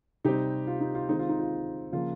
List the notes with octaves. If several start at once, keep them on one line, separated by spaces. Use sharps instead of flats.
C3 G3 C4 D#4 G4
F4
D#4
F4
D#3 G#3 C4 D#4
F4
D#4
F4
C#3 F3 A#3 F4